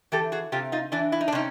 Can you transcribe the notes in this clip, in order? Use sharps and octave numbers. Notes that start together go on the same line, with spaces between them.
E3 G4 A4
F#4 G#4
C3 F4 G4
D#4 F4
E3 D4 E4
E4
D#4
D4
C3 C#4 D#4